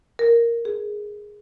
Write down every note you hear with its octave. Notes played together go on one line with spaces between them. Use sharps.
A#4
G#4